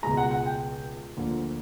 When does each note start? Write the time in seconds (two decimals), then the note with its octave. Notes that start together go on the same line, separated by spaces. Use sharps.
0.03 C#2 B2 G#3 A#5
0.17 F#5
0.31 F#5
0.46 G5
1.17 D2 D3 F3 A#3